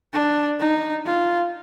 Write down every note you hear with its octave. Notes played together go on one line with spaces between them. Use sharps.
D4
D#4
F4